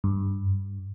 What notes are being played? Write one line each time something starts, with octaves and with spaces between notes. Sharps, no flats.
G2